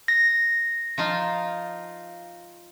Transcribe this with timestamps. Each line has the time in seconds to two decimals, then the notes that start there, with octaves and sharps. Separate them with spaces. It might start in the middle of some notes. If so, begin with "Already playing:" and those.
0.08 A#6
0.98 F3 D#4 F4